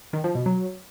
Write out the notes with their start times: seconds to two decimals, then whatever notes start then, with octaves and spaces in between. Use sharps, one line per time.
0.13 D#3
0.24 F3
0.35 B2
0.46 F#3